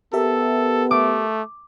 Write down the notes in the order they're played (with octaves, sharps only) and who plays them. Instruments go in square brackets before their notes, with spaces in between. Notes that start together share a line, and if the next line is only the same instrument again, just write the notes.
[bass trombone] B3 [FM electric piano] G4 A#4 E5 [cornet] A4
[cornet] A3 [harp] D6